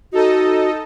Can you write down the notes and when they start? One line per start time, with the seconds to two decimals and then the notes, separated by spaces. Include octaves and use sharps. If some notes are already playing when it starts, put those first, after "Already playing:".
0.12 D#4 F#4 A4 D#5